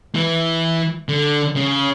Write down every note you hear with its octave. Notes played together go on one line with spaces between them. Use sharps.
E3
D3
C#3